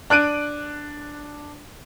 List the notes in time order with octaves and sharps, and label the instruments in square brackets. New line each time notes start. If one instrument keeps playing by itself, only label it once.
[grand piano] D4 F#6 D7 D#7